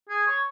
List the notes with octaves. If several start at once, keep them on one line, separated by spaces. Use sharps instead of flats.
G#4
C#5